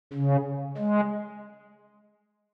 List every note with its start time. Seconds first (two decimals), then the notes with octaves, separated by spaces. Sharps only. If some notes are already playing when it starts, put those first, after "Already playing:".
0.13 C#3
0.78 G#3